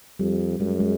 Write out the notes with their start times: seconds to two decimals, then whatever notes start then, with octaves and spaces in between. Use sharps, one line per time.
0.19 F2 G3
0.60 F#2 G#3
0.80 G#3